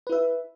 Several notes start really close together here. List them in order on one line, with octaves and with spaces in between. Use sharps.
B4 E4 E5